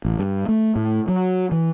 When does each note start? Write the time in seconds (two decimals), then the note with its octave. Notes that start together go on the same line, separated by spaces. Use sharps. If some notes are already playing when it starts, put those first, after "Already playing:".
0.05 A1
0.19 G2
0.48 A3
0.76 A2
1.08 F#3
1.52 E3